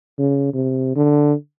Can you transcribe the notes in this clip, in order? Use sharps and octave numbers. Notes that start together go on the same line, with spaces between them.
C#3
C3
D3